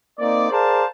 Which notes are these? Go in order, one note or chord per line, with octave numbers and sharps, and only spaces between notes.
A#3 C4 D#4 D5
G#4 A#4 C5 D5 F5 A5